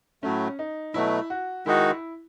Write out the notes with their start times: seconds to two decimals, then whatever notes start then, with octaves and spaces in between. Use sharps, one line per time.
0.23 A2 F#3 A3 C#4
0.59 D#4
0.94 B2 F#3 A3 E4
1.30 F#4
1.66 D#3 G#3 D#4 E4 F#4
1.90 E4